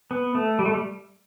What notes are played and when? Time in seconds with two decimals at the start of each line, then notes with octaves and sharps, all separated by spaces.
0.11 B3
0.35 A3
0.59 G3
0.66 A3
0.73 G3